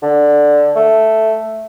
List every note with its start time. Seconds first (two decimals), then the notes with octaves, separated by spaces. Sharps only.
0.02 D3
0.76 A3